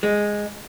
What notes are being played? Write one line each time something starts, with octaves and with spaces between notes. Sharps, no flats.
G#3